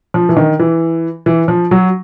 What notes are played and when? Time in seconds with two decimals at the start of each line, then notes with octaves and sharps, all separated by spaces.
0.14 F3
0.29 E3
0.36 D#3
0.60 E3
1.26 E3
1.48 F3
1.71 F#3